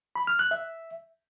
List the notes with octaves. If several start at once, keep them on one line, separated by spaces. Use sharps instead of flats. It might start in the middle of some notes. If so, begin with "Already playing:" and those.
B5
F6
F#6
E5